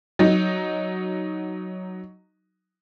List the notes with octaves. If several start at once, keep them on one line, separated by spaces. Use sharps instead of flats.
F#3 D#4